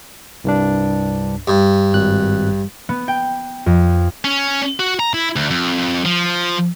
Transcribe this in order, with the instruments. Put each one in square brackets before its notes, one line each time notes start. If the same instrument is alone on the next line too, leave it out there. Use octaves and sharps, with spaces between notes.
[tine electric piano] C2 G2 D4
[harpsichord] G2
[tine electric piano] G#1 F#6
[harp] B3
G5
F2
[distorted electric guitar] C#4
F#4
A#5
E4
D2
F2
F3